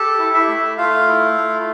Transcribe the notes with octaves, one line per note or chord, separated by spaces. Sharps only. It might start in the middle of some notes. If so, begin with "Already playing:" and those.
Already playing: G4 A4 A5
E4
E4 E5
A3
A3 F4 F5
E4
A3